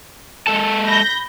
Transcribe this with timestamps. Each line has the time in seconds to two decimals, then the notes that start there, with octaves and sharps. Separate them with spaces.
0.47 G#3 A4 A5
0.86 B5 G6 A#6